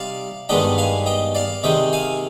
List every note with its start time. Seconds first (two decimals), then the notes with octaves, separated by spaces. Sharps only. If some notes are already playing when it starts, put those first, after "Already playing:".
Already playing: C3 G3 C4 D#4 D5 F5
0.49 G2 D#3 G#3 B3 D4 D#5 G5
0.78 F5 G#5
1.06 D#5 G5
1.35 D5 F5
1.63 C3 D#3 G#3 D#5 G5
1.93 F5 G#5